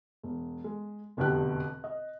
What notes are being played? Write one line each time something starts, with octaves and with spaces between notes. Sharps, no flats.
E1
G#3
F1 E2 B2 D3 G4 F#6
D#5